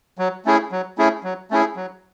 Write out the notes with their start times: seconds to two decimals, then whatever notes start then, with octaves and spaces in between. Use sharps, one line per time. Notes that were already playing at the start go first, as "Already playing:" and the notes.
0.18 F#3
0.45 A3 C#4 E4 G#4
0.72 F#3
0.98 A3 C#4 E4 G#4
1.24 F#3
1.51 A3 C#4 E4 G#4
1.76 F#3